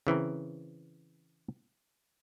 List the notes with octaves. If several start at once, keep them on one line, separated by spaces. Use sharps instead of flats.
C#3 E3 C4 A#4